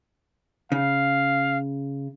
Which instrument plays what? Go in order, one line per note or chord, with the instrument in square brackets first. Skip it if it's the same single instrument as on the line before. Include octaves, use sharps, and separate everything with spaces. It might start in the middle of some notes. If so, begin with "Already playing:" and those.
[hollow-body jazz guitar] C#3 [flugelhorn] F5